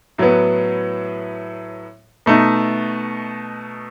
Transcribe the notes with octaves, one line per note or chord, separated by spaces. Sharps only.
A2 F#3 B3
B2 A3 D#4